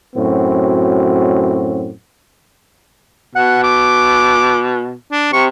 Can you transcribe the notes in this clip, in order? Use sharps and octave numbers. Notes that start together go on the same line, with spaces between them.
F#2 A2 C4 F#4
B2 F#5
D6
D4
C3 C#6